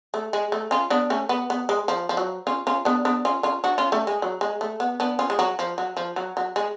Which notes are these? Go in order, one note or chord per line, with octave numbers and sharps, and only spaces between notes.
A3
G#3
A3
C#4 F4
B3 D4
A3 C#4
B3
B3
G#3
F3
F3
F#3
C#4 F4
C#4 F4
B3 D4
B3 D4
C#4 F4
C#4 F4
D4 F#4
C#4 F4
A3 C#4
G#3
F#3
G#3
A3
B3
B3 D4
C#4 F4
G#3
F#3
F3
F#3
F3
F#3
F#3
G#3